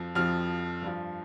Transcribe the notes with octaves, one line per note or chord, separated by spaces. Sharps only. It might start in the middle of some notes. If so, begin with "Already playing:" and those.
Already playing: F2 F3
F2 F3 F6
G2 F3